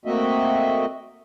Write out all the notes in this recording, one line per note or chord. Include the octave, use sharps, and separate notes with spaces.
A3 A#3 C4 F#4 D#5 E5